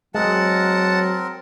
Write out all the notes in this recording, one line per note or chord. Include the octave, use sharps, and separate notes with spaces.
F#3 G#3 C4 A#4 F#5 A5